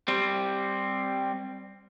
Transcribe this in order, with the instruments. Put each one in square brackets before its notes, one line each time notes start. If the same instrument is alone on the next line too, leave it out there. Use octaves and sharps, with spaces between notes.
[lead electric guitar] G3 C4